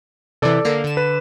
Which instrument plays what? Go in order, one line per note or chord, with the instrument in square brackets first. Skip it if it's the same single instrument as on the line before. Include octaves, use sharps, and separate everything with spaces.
[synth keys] C3 E3 [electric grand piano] A4 D5
[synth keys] D3 A#3 F6
D3 E7
[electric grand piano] B4